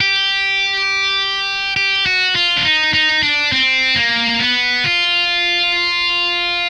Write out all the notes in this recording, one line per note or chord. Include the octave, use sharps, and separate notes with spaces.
G4
G4
F#4
F4
D4
D#4
D#4
D4
C4
A#3
B3
F4